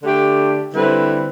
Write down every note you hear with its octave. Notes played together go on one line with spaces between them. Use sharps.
D3 A3 D4 G4
D3 G3 C4 E4 B4